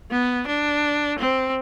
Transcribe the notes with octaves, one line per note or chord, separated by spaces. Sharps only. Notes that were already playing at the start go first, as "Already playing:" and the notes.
B3
D4
C4